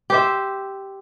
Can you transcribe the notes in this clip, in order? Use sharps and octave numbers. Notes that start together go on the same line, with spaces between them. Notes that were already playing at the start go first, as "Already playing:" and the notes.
G4 C5 E5